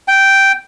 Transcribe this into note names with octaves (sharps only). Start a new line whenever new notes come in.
G5